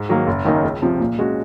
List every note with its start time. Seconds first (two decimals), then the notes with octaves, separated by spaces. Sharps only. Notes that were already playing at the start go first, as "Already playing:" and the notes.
Already playing: G#2
0.09 D#3 F#3 A#3
0.27 F#1
0.45 F#2 D#3 A#3 D#4
0.64 C#2
0.82 C3 F3
1.00 A#2
1.19 G#3 C#4 F#4